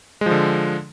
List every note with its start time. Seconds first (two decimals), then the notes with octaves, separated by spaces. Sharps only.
0.21 G#3
0.26 F3
0.31 D3